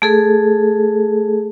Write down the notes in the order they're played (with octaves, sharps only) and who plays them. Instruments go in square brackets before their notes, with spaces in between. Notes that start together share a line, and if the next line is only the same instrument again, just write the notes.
[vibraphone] A3 G#4 A4